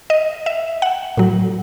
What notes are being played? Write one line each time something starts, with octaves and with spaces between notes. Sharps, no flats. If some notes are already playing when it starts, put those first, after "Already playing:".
D#5
E5
F#5
A2 F#3